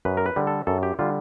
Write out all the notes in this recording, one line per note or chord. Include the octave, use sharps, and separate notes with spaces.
F#2 B4
A#4
B4
D3 G3
A4
F#2 A4
G4
D3 G3 F4